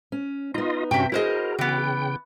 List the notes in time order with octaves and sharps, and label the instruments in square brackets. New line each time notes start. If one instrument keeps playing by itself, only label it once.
[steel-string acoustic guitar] C#4
[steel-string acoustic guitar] B3 D#4 [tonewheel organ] F4 D#5
[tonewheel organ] G2 C#4 F#4 [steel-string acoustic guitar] C3 [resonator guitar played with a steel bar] E5 G5
[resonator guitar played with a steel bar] E4 C5 D#5 [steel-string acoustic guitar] F#4 G#4 [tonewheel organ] A#4
[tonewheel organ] C#3 G5 [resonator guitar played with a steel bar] E3 B3